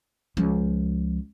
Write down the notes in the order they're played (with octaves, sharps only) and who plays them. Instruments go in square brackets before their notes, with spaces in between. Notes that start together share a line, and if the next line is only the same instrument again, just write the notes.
[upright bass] C#2 F3